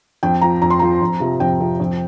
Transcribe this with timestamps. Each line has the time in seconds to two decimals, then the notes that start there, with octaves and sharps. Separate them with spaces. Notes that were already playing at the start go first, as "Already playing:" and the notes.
0.23 F2 G5
0.41 F3 A#5
0.62 F2 A#5
0.70 C6
0.79 F3 A#5
1.02 F2
1.20 C3 F3
1.40 F2 G5
1.60 C3 F3
1.80 F2